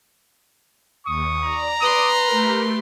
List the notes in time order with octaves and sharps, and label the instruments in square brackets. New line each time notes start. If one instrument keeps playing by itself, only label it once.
[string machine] D#2 [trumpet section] C#6 D#6
[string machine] D5 [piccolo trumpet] A#5
[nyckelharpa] B4 C6 [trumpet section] D6 D#6
[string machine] A3 G4 [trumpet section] A#4